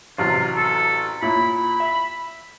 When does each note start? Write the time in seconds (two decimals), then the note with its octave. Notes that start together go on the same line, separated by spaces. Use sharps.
0.18 A1 C3 F#3 F4
0.56 A4
1.22 A#2 C#4 E4 B5
1.80 E5